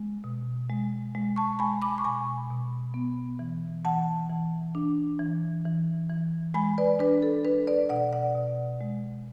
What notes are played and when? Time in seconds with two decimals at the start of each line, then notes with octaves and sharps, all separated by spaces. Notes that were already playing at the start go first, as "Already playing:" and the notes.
Already playing: G#3
0.24 B2
0.70 G#3
1.15 G#3
1.36 A5 C#6
1.59 G#3 G#5 B5
1.82 B5 D6
1.98 C#6
2.04 B2 G#5 B5
2.50 B2
2.94 B3
3.39 E3
3.84 E3 F#5 A5
4.30 E3
4.75 D4
5.19 E3
5.65 E3
6.10 E3
6.54 G#3 G#5 B5
6.78 B4 D5
6.99 D4 B4
7.23 A4
7.45 D4 B4
7.67 B4 D5
7.89 B2 D5 F#5
8.13 D5 F#5
8.35 B2
8.81 G#3